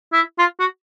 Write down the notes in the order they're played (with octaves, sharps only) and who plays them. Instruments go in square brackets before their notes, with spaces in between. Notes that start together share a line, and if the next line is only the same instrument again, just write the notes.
[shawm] E4
F4
F#4